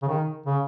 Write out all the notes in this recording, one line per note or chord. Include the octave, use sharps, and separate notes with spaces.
C#3
D#3
C#3